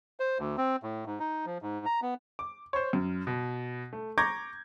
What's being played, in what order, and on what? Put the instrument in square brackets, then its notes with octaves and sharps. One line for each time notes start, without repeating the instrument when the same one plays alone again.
[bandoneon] C5
D2
C4
A2
G#2
D#4
F3
G#2
A#5
B3
[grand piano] D6
C5 C#5
F#2
B2
A3
A#5 C#6 D6 G6 G#6 A#6